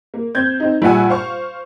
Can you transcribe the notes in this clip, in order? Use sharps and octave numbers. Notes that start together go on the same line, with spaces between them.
A#3
C4 G6 G#6
C4 D#4
A#1 G3 F4 F#5 G#5 E6
C5 F5 C#6